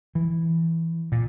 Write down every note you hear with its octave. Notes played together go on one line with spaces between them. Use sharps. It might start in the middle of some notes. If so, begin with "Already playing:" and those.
E3
A#2